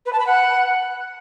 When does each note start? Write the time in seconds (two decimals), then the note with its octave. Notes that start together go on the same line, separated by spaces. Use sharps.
0.06 B4
0.13 A5
0.20 B5
0.27 F#5